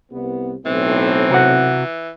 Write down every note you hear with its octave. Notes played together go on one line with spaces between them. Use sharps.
C2 B3
B1 A2 E3 C4
C3 F#4 F#5